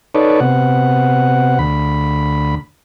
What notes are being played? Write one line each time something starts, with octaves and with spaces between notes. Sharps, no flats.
D#4 A4 B4 C#5 D5
C3 B3 F#5
D2 B5